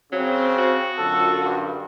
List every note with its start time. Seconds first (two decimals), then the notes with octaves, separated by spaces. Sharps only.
0.12 C#3 F#3 C4
0.58 F#4
0.98 F#2 D3 F4 A4
1.44 G2